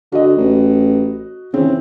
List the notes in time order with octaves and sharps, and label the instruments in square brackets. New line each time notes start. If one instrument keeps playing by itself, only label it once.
[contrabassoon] D3 [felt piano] F#4 D#5
[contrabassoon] A1
[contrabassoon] C#3 [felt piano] E3 C4